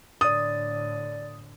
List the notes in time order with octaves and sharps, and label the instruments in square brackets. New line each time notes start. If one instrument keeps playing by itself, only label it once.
[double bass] A2 D3 [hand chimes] D5 A6 [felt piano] D#6